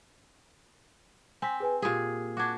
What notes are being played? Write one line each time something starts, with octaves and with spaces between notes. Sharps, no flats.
C4 G#5 B6
G#4 B4 G#5
A#2 G4 G#4
D4 F#4 D6 G#6